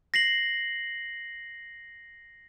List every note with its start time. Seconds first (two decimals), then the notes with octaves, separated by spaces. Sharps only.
0.14 A#6 C7 F#7